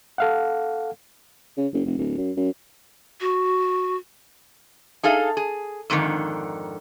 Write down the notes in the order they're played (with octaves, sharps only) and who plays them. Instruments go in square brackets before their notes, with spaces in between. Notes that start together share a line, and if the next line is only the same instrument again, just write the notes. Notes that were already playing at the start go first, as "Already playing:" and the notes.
[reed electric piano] A4 F5 F#5
[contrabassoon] C#3
F#1
F1
D1
F#2
F#2
[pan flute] F#4
[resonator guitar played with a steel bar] D#4 G#4 A4 F5
G#4
F2 G#2 D3 D#3